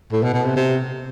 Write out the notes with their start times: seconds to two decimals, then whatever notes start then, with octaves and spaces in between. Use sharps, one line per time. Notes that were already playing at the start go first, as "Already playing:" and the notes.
0.12 A2
0.23 B2
0.34 B2
0.45 C3
0.56 C3